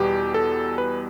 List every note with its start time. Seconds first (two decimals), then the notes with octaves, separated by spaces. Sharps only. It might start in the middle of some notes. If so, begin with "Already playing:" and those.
Already playing: E2 B2 G3 G4
0.34 A4
0.78 B4